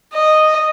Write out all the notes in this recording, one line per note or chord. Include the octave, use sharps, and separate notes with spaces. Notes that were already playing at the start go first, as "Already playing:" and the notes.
D#5